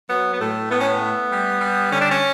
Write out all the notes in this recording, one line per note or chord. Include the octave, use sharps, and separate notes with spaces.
F#3 B3
B3
A2 A3
A2 B3
C#4
B3
A3
G3
G3
D3 C#4
D4
C#4